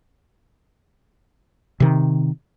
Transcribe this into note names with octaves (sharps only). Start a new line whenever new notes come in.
C3 D#3